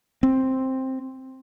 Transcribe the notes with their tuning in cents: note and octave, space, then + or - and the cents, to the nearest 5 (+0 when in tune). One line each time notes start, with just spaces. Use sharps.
C4 +5